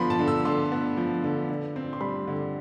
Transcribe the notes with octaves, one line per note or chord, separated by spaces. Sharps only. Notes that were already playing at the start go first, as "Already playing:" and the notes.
Already playing: D3 F3 B3 B5 C6
A5
D3
E6
D3 C6
B3
F3
D3
D3
C4
C6
G3 B5
D3